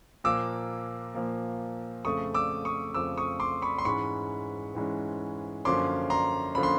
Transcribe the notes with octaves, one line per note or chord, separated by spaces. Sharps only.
A#2 F3 A#3 D6 E6
A#2 F3 A#3
F2 C#3 F3 A3 C#6 D#6
D6 E6
C#6 D#6
F2 C#3 F3 A3 D6 E6
C#6 D#6
C6 D6
B5 C#6
C6
G#2 E3 G#3 C#4 B5 C#6
G#2 E3 G#3 C#4
F#2 D3 F3 A#3 C#4 C6 D6
A#5 C6
D3 F3 A#3 C#4 B5
C6